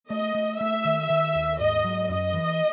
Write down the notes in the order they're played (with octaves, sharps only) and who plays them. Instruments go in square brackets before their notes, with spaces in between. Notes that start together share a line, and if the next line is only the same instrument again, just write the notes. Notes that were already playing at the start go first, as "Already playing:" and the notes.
[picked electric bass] A3 [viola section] D#5
[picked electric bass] A3
[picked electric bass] A3 [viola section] E5
[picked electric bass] D#3
D#3
D#2
[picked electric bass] G#2 [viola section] D#5
[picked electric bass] F#3
[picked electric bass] F#2 [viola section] D#5
[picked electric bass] E3